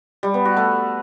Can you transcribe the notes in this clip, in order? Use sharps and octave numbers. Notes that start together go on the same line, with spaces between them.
G3
B3
F#4
A3